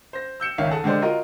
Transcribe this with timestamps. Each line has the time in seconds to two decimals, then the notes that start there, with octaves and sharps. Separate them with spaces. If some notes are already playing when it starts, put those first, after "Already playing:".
0.13 C5 A#6
0.40 E6 G6 C#7 E7
0.58 G#1 C#2 D#3 C#5 E5 F5
0.71 G#4 A4 F#5 A5
0.84 D3 G#3 G4 C5 D5
1.02 F4 F#4 A#4 D#5